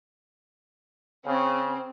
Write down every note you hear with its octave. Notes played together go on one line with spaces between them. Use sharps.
C#3 C4